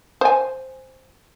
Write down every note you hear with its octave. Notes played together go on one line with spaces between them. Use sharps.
C5 G#5